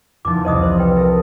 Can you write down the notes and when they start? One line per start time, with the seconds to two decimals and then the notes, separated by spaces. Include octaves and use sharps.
0.25 E2 F3 D#4 D6
0.45 C2 C5 D#5 D#6 D#7
0.63 C5
0.78 B4 G5
0.95 A4 A#4 D#6